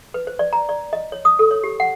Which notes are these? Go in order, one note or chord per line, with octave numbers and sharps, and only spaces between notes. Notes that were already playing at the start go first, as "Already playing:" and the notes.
B4
C5
D5
A#5
D5
D#5
C#5
D#6
A4
C#5
G4
F#5